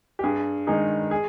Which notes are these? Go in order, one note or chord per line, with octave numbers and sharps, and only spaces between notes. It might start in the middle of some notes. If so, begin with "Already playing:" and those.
G4
G2 G#4
D#3 G#3 D#4 G#4
G#4